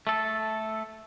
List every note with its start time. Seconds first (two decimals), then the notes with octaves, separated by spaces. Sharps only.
0.07 A3 A4